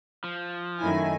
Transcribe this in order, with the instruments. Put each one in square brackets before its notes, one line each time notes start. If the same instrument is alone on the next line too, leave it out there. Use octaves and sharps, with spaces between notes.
[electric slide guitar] F3
[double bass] F#2 A3 [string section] D#3 G#5 [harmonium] E4